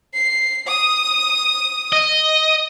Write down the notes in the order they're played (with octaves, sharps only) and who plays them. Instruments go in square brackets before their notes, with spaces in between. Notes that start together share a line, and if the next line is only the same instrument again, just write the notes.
[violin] C7
D#6
[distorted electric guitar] D#5